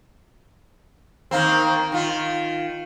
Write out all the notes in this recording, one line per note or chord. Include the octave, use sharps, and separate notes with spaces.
D#3 A#3 C4
D#3 F4